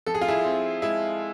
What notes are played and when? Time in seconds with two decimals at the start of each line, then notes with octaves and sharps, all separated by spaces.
0.06 F3 A4
0.15 G#4
0.21 F4
0.28 E4 G#4
0.44 C4
0.82 G#3 E4